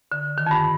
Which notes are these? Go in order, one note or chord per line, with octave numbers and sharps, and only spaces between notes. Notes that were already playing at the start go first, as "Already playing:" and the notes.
D3
D#3
F2
G2